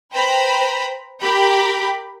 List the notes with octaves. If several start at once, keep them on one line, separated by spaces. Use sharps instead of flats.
B4 C5 G5 A#5 B5
G4 A#4 G5 B5